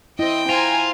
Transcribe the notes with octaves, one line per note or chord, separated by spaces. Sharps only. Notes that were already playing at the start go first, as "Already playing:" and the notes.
C4 E4 D#5 G5
F4 C5 G#5 A#5